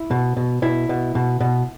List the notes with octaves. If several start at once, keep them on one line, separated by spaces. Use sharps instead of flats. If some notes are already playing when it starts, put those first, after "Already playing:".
Already playing: E4
B2
B2
B2 E4
B2
B2
B2